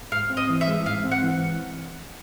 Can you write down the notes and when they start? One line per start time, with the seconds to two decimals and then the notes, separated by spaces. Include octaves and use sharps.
0.12 G#2 F5
0.30 C4
0.37 D#5
0.49 E3
0.61 E5
0.67 G#3
0.86 G#2 F5
1.04 C4
1.12 F#5
1.23 E3